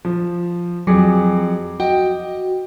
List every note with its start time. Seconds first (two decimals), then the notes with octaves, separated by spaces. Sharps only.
0.05 F3
0.87 F2 F#3 G#4 D6
1.80 F#4 D#5 G5